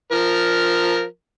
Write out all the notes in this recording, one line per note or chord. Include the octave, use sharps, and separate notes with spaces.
F3 A#4